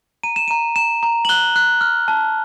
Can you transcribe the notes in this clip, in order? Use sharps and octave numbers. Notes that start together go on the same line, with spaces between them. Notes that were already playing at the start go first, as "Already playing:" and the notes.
A#5 D#7
E7
A#5 D#7
A#5 E7
A#5
F#7
F#6 G7
F#6
F6
A5